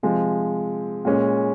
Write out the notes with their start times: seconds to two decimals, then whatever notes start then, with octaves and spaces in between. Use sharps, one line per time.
0.03 C3 F3 G#3
1.05 A#2 G#3 C#4